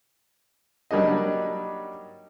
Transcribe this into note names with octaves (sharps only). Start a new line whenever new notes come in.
F#3 G3 A#3 D4 D#4 D#5